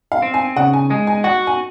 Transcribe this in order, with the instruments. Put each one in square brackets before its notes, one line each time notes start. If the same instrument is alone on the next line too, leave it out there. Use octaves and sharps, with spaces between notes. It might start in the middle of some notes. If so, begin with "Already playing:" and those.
[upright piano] F5
[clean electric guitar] C4
[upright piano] G#5
[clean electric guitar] C#3 [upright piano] F#5
[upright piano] G#5
[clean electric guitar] G#3 [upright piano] G#5
[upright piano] G#5
[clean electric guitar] F#4 [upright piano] F#5
[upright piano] G#5